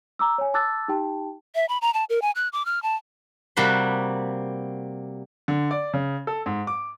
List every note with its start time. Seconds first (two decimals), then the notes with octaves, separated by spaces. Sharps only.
0.19 A#5 D6 E6
0.38 C#5 G#5
0.54 A5 D6 E6 F#6 A6
0.88 D#4 G4 G5 A5
1.55 E5
1.69 B5
1.82 A#5
1.94 A5
2.09 A#4
2.22 G#5
2.35 F#6
2.53 D6
2.65 F6
2.83 A5
3.57 C3 G3 A#3 F#4 B5 C6
5.48 D3
5.71 D5
5.94 C#3
6.27 A4
6.46 G#2
6.67 D6